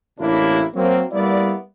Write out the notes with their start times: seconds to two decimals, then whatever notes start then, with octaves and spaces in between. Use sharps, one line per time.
0.19 A1 C3 A#3 D4 E4 C#5
0.75 F#3 A#3 C4
1.11 G3 A#3 B3 E4 D5